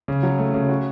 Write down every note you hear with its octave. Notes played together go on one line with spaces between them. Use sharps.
C#3
F#3
A3
C#3
F#4